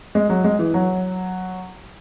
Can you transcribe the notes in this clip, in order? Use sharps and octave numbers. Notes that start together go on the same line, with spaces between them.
G#3
F#3
G#3
E3
F#3